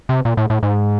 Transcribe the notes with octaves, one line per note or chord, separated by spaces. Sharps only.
C3
A#2
A2
A2
G#2